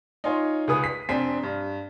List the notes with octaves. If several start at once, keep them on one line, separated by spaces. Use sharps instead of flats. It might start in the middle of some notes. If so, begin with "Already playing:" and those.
D#4 F4 C#5 G#5 C6
C#2 G#4 B4 D#6
B6
F1 C4 D4 G#5 B6
G2